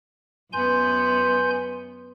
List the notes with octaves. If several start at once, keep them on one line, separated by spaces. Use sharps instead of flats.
F#2 B3 B4 G#5 C6 G6